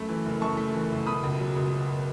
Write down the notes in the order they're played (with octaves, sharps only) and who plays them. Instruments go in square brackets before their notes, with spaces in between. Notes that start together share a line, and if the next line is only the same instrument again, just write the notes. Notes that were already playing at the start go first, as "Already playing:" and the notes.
Already playing: [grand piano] F#2 A3 B5
E3
F#1
F#2 A5 C#6
A3
E3
F#1
B2 B5 D#6
C#2
F#3
C#2
B2